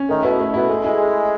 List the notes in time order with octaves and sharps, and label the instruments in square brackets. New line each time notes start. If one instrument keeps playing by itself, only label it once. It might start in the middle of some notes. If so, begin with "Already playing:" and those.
Already playing: [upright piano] C#4
[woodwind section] D#3 [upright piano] A3
[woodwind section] B2 [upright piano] E4
[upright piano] A3
[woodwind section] B2 [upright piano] E4
[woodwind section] G#3 [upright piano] A3
[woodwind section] G#3 [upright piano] E4